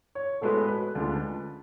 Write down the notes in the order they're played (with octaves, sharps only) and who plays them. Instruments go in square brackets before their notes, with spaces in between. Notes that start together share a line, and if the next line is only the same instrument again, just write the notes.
[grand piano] C#5
[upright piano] A2 G#3 B3 F#4 B4 [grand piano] A4
[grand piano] B4
[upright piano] D2 C#3 G#3 D4 F4